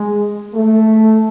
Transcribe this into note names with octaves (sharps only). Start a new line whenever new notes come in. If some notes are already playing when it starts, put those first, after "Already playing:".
Already playing: G#3
A3